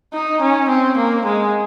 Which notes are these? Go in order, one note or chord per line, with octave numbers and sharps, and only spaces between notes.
D#4
C#4
C4
A#3
G#3